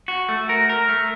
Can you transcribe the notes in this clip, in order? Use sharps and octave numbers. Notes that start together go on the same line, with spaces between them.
F#4
A3
A#4
A#4
A3